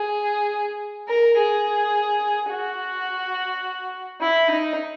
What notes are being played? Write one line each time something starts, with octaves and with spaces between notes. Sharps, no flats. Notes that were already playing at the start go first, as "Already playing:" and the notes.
Already playing: G#4
A#4
G#4
F#4
E4
D#4